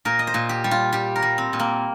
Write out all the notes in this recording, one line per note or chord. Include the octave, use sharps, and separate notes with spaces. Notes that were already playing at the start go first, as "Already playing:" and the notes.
A#2 A#4
D#5
C5
A#2
G4
G3
F4
G3 G4
A#4
G3
C4
A#2
A#3